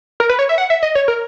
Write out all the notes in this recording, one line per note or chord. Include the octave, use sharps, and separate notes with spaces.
A#4
B4
C#5
E5
F#5
E5
D#5
C#5
A#4